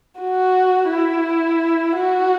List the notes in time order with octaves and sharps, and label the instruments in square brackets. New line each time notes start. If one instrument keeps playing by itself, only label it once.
[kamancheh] F#4
E4
F#4